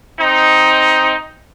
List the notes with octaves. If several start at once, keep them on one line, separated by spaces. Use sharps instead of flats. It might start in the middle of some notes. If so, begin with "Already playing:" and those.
C4 D#4